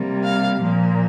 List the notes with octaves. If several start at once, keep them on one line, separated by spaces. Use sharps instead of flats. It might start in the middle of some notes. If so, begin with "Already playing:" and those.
Already playing: C3 G3 A#3
F5
A#2 F3 A#3